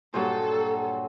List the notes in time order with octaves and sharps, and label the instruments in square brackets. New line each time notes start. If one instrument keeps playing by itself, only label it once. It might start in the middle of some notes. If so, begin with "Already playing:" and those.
[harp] G2 A#2 [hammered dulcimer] F#3 G#4 C5 [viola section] A4